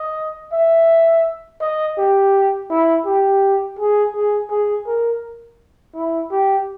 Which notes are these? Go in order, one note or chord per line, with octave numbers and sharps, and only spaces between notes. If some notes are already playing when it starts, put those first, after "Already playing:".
Already playing: D#5
E5
D#5
G4
E4
G4
G#4
G#4
G#4
A#4
E4
G4